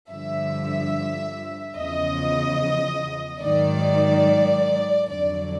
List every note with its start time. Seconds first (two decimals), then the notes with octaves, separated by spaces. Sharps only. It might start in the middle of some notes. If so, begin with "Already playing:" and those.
0.11 G2 D3 F3 E5
1.76 E2 C#3 F3 D#5
3.42 G#2 D#3 F#3 D5
5.09 F2 D3 F#3 D5